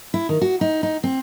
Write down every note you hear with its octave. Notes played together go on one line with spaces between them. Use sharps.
E4
D#3
F#4
D#4
D#4
C4